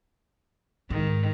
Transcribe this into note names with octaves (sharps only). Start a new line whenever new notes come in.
G#2 D#3